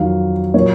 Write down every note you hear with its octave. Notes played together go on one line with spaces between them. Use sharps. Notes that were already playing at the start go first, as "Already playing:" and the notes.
Already playing: F2 D#3 F#3 F5
A#2 F#3 C#5